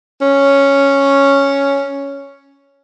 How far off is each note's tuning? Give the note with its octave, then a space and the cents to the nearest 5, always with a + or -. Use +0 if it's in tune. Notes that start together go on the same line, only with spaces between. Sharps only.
C#4 +0